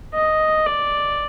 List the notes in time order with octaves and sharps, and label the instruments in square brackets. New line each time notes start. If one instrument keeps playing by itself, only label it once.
[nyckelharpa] D#5
D5